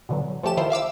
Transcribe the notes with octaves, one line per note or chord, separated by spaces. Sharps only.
B2 D3 E3 F#3
F3 A3 C#4 G4 A5 E7
D#3 E4 F4 C5
E5 F5 D6 E6